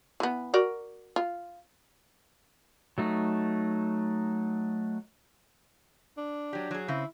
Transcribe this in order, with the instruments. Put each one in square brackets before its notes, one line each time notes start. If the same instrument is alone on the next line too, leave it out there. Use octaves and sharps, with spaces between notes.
[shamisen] E3 B3
F#4 A#4 D5
F4
[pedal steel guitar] F#3 A3 D#4
[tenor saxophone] D4
[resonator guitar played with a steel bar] F#3 G4
F#3 G#4
[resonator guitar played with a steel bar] C#3 C4 [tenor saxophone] E4